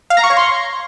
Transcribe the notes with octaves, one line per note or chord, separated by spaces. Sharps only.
F5
A#5
C#6
C#5
C6